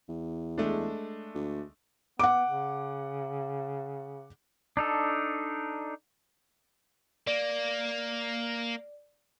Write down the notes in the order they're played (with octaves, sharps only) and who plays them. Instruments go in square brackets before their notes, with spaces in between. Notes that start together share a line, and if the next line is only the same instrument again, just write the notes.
[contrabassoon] E2
[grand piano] G#3 A3 D4
[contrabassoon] D2
[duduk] B3 [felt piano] F#5 D6
[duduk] C#3
[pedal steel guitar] D4 D#4 A4
[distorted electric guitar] A#3 [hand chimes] D5